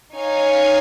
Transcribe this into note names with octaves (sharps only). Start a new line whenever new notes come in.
D#4 C#5 F5 G#5